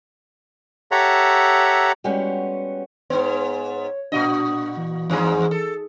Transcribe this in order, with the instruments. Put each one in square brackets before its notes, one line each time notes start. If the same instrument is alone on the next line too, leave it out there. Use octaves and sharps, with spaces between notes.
[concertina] G4 A4 C#5 E5 F#5 A#5
[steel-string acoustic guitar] G3 G#3 B3 C#4 F#4 G4
[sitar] G#2 B3 [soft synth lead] C#5
[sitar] A#2 F#4 D#5 [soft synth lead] D4
[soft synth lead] E3
[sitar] E2 G#2 G#4
A4